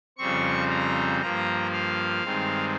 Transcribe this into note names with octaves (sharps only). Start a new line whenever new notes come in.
F2 C#3 G3 C4 C#6
A#5
G2 F3 A#3 A#5
F5
G2 D#3 G#3 C4